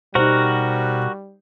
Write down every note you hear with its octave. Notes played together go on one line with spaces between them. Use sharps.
B2 G3 D#4 F#4 G4 A#4 C5 F#5